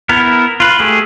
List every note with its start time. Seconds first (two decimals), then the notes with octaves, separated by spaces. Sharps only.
0.09 B3 E4 A#4
0.60 F4 B4
0.80 A3 G4 G#4